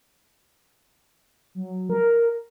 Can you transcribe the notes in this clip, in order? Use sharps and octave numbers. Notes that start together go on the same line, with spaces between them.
F#3
A#4